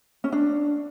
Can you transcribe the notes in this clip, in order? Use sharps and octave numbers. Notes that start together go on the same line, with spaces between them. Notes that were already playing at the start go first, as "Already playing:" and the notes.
C#4
D4